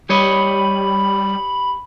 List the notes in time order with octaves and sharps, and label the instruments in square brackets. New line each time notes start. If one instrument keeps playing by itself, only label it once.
[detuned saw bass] G3 [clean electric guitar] G4 C#5 D#5 [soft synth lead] B5